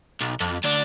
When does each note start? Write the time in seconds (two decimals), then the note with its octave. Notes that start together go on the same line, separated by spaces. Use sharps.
0.21 B1
0.40 F2
0.64 D2 D4